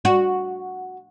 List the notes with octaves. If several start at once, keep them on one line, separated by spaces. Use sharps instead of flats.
F#4